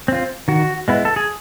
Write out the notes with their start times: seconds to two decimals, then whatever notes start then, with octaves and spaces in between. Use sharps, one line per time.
0.08 C4 F4
0.48 D#3 F#4
0.88 G#3 B3 E4
1.05 A4
1.16 G#4